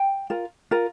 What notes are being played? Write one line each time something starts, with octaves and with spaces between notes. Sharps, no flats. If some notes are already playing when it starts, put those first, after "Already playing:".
Already playing: G5
F4 A#4
F4 A#4